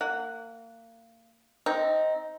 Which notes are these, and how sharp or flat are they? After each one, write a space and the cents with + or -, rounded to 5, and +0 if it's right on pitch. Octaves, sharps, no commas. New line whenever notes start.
A#3 -30 F#5 +0
C4 -5 D#4 +10